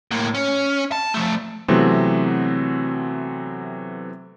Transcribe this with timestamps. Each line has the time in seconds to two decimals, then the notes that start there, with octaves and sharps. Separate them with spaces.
0.11 A2 A#3
0.35 C#4
0.92 A5
1.14 F3 A3
1.68 C3 E3 F#3 A3 B3 C4